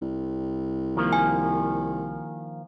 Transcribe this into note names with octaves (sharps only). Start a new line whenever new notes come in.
C2
D#3 F3 A#3
G#5